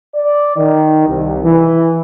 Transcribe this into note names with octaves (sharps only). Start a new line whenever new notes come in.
D5
D#3
C2
E3